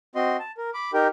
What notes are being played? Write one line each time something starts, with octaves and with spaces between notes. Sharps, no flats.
C4 F#4 D#5 C6
A5
A#4
B5 D6
D#4 G4 A#4 G5